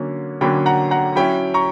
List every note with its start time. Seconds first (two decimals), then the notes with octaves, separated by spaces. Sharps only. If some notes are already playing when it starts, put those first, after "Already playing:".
Already playing: D3 F#3 A#3 C#4
0.41 D3 F#3 A#3 C#4 G5 B5
0.66 F#5 A#5
0.91 F#5 A#5
1.16 F#3 C#4 E4 G5 B5
1.54 A#5 C#6